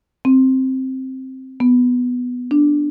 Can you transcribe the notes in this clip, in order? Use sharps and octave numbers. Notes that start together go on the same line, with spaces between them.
C4
B3
D4